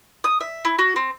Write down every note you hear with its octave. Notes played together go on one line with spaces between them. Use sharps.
D#6
E5
E4
F#4
C4